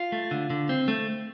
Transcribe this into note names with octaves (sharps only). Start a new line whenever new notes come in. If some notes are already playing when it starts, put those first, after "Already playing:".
Already playing: F4
A3
D3
D3
C4
A3